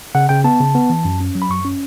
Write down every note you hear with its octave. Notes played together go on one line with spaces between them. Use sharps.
C#3 F#5
C#3 G5
B3 A5
C#3
B3
E3
F#2
C#4
F#3
B5
F#2 C#6
C#4